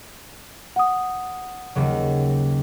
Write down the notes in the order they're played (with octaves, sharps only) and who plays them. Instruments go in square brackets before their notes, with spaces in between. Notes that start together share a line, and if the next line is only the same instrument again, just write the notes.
[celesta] F#5 D#6
[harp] D#2 C#3 F#3